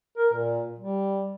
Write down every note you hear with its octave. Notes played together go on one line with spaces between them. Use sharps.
A#4
A#2
G3